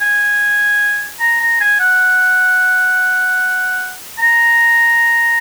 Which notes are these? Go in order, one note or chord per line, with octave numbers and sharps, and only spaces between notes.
G#5
A#5
A#5
G#5
F#5
A#5